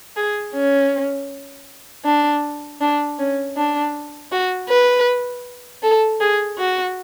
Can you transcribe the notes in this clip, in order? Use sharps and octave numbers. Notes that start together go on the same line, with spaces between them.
G#4
C#4
D4
D4
C#4
D4
F#4
B4
A4
G#4
F#4